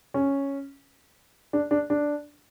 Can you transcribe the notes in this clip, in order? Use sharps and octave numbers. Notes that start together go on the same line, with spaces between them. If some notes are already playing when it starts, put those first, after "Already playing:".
C#4
D4
D4
D4